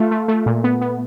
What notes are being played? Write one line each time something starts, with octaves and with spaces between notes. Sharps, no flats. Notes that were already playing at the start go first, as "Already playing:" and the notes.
Already playing: A3 F4
A3
A3
A#2
B3
B3